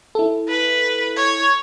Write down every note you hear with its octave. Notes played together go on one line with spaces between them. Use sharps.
E4 A4
B4
C#5